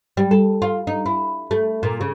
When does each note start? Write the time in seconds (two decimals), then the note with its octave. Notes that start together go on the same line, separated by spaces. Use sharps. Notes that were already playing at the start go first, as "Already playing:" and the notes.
0.17 G3
0.31 A4
0.62 F4
0.87 D#4
1.06 E4
1.51 A3
1.83 A#2
2.01 C#3